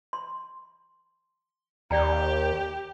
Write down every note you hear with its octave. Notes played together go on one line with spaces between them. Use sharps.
C6
D#2 G4 D5 G5 A#5